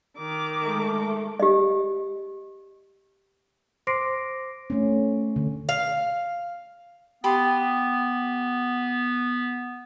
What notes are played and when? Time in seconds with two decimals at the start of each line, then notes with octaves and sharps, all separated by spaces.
0.18 D#3 D6
0.61 G#3 A3
1.40 G4 D#5
3.87 C5 C6 D6 A#6 C7 D7
4.70 A3 C#4
5.36 D3
5.69 F5
7.24 B3 G4 B5 C6